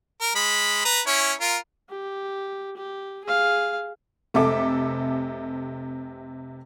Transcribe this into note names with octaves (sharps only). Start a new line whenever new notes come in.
A#4
G#3 B5
B4 A#5
C#4 E4 C#5
F4 A#4
G4
G4
G#4 F5
F1 C3 A4 E5 D6